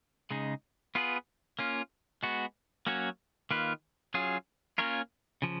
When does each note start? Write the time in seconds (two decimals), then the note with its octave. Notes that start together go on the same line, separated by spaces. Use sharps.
0.31 C#3 G#3 D#4
0.95 B3 F4 G#4 B4
1.59 A#3 C#4 F4
2.23 G#3 B3 F#4
2.87 F#3 A#3 C#4 F#4 C#5
3.51 D#3 A#3 F4 B4
4.14 F#3 C#4 F4 G#4
4.78 A#3 C#4 F4 A#4 C#5
5.42 C#3 F3